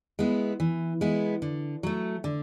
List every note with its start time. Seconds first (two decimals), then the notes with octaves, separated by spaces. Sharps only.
0.19 G#3 B3 E4
0.60 E3
1.01 G#3 B3 E4
1.42 D3
1.83 F#3 A3
2.24 D3